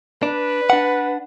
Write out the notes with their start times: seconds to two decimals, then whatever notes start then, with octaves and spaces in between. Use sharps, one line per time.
0.23 D4 B4
0.70 D4 F#5